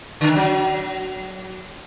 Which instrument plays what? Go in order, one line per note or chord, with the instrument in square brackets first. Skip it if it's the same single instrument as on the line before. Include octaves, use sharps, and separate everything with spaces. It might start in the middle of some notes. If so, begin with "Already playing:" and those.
[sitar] D3
D#3
F#3